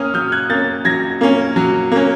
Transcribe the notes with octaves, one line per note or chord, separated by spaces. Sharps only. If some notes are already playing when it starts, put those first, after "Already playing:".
Already playing: A#3 C#4 D#6 F6
F#3 F6 G6
F#6 G#6
A#3 C#4 G6 A6
F#3 G#6 A#6
A#3 C#4
F#3
A#3 C#4